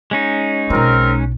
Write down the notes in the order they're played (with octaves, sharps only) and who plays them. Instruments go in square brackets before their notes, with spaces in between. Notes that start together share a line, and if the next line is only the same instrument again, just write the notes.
[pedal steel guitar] G#3 C#4 D#4
[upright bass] B1 F4 [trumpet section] C4 A#4